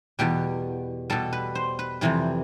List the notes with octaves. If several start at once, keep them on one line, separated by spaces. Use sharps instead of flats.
E2 B2 G3 G4
B2 G3 A4
B4
C5
B4
F2 C3 E3 G3